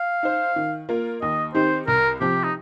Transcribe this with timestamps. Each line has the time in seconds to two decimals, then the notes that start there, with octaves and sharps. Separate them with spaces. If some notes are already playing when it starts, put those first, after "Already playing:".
Already playing: F5
0.23 D#4 C5
0.56 D#3
0.89 A#3 F4 A#4
1.22 D#2 D#5
1.55 D#3 C4 D#4 G4 C5
1.87 C2 A#4
2.21 C3 F3 C4 G4
2.44 D#4